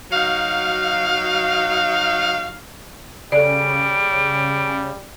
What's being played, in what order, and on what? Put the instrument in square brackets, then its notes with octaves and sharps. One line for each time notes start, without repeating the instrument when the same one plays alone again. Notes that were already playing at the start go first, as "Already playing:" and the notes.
[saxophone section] F#3 D#4 F#4 F5
[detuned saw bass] C#3 [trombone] G3 [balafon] A4 D5 [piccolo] D7